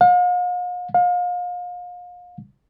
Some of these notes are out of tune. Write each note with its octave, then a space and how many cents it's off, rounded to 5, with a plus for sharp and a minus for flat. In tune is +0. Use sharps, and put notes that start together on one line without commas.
F5 +45
F5 +35